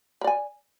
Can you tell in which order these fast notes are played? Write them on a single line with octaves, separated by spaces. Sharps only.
A#4 D5 G#5